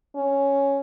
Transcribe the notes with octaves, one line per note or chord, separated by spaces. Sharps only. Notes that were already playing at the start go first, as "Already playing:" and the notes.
C#4